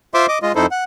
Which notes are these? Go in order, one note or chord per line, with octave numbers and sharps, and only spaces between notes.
F4 C5 E5 C6 D6
D#5 D6
G#3 F4 D#5
F2 D#4 E4 A4 C5
F#5